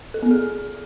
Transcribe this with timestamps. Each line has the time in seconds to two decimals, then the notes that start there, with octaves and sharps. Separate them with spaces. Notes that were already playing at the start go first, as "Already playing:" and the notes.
0.14 A4
0.23 B3
0.31 G#4